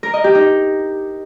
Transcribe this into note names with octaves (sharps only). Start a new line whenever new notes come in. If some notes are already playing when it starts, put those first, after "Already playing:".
A#4
D#5
G4
D#4